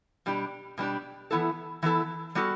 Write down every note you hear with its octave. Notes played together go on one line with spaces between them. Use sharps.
B2 G3 D4 G4
B2 G3 D4 G4
E3 B3 E4 A4
E3 B3 E4 A4
G3 B3 F#4 A4